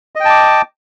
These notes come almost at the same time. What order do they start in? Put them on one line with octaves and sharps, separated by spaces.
D#5 G5 A5 D6